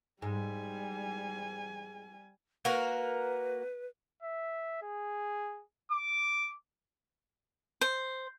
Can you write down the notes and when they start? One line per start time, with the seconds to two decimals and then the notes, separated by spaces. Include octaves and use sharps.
0.22 G#2 G3 G#5
2.65 A#3 F#4 A#4 B4
4.22 E5
4.82 G#4
5.91 D6
7.81 C5